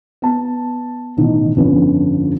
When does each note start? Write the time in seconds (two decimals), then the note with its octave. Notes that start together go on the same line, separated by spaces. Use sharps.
0.22 B3 A5
1.17 A1 B2 D#3
1.56 G1 F2 D3 C#4 B4